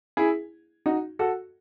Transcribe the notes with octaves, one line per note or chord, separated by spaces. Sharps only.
E4 G#4
D#4 F#4
F#4 A4